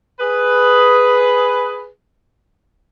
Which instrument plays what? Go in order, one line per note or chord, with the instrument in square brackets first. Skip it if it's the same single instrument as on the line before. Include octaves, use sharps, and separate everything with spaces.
[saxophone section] G#4 B4